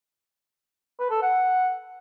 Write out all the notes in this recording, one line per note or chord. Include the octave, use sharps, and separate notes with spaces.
B4
A4
F#5